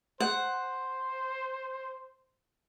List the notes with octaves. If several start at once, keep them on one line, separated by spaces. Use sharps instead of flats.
C5 F#5